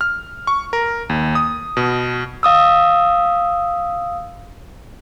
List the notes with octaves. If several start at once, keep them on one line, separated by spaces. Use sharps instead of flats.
F6
C#6
A#4
D#2
D#6
B2
F5 D#6 E6